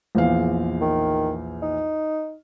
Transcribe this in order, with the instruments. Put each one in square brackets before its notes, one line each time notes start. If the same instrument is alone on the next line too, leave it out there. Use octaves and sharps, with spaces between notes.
[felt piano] A#1 E2 F5
[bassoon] D#3
D#4